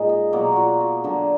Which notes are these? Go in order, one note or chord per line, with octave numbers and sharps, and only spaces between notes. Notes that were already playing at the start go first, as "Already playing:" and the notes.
Already playing: A#2 G#3 A#3 D#4 F4
D#5
B2 F#3 A#3 D5
F4 F#4
F#4
D3 F#3 A#3 D4